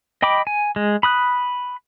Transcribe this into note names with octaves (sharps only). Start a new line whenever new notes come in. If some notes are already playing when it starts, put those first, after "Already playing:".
D#5 G5 B5 D6
G#5
G#3
B5 D#6 F#6